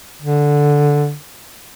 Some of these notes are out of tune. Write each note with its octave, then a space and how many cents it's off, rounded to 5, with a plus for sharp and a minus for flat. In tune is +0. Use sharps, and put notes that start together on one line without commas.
D3 -5